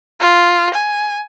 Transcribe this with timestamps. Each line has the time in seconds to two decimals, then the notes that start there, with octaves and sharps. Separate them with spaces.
0.21 F4
0.74 G#5